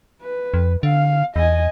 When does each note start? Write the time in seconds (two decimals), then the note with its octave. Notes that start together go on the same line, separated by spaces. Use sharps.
0.22 B4
0.54 F2
0.83 D3 F5
1.36 E2 D#5 G#5